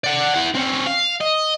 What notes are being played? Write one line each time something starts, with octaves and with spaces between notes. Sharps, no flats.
D5 F#5
E4 F#5
C4 C#4
F5
D#5